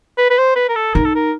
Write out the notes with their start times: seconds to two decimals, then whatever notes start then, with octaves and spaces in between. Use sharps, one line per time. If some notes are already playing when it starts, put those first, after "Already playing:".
0.18 B4
0.30 B4
0.38 C5
0.56 B4
0.69 A#4
0.75 A4
0.94 D#4 A#4
1.04 A4
1.15 A#4